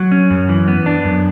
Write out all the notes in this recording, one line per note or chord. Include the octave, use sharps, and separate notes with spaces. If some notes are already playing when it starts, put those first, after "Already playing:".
Already playing: F#3
C#4
F#2
E3
B3
D4
F#2